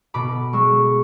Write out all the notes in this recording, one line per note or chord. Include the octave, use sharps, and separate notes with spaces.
B2 B5 D6
G#3 C#6 E6